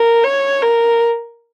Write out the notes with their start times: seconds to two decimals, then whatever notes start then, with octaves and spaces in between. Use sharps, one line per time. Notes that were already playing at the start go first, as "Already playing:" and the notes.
Already playing: A#4
0.24 C#5
0.63 A#4